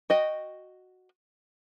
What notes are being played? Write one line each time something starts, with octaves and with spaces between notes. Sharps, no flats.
F#4 D#5 G5